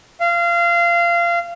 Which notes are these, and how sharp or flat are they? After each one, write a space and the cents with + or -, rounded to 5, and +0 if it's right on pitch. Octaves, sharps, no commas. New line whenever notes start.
F5 -25